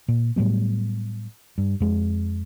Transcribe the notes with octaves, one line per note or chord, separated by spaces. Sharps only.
A#2
A2 F#3 G3 B3
G2
F2 G#3